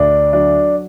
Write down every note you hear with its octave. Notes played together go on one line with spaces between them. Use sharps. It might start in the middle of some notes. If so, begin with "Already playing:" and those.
Already playing: D2 D4
F#3 D4